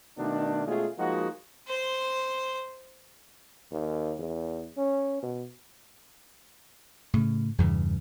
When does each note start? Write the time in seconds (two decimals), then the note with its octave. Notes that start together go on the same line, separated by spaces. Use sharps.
0.17 B2 D#3 A3 D4
0.65 B2 G#3 A3 C#4 F4 G#4
0.97 F3 G#3 A#3 D#4 F#4
1.68 C5 C6
3.72 D#2
4.19 E2
4.78 C#4
5.23 B2
7.13 A2 C#3
7.58 E2 G2 C#3 E3